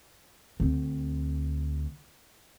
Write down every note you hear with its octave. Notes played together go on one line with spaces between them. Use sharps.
D2 C4